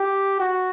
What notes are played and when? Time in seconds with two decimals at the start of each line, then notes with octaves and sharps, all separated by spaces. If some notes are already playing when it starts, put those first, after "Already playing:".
Already playing: G4
0.40 F#4